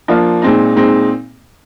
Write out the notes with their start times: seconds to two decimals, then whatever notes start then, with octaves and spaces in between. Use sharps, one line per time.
0.08 F3 A#3 D4 F4
0.42 A#2 G#3 C4 D#4
0.76 A#2 G#3 C4 D#4